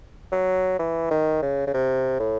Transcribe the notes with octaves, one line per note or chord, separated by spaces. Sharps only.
F#3
E3
D#3
C#3
C#3
C3
A2